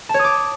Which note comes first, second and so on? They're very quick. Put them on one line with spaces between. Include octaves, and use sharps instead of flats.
A5 C#5 D#6 D6